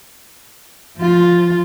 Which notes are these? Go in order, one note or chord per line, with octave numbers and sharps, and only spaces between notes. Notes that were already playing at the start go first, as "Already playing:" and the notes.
F3 F4